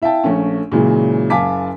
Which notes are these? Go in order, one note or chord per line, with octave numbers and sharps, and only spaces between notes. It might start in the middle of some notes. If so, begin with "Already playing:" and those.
E4 E5 F5 G5 A5
A#1 A3 C#4
A#2 C#3 E3 F#3 G#3
F#1 F5 G#5 A5 D6 B6